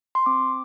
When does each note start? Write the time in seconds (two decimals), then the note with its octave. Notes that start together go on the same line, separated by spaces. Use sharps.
0.15 C6
0.26 C4 D6